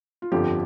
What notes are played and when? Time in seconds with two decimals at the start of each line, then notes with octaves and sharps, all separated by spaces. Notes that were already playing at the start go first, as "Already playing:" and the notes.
0.22 F4
0.32 G1 F2 D3 F3 G4